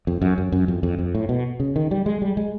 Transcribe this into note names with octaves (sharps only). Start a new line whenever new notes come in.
F2
F#2
F#2
F#2
F2
F2
F2
A2
B2
C#3
D#3
G3
G#3
G3
G#3